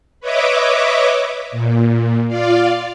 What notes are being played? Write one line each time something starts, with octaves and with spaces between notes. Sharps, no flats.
B4 C#5 D#5 E5 D6
A#2
F4 D5 F5